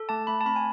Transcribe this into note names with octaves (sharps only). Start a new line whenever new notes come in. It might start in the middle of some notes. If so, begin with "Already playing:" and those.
Already playing: A4
A3 A5
A3 B5
A5
C4 B5
G#5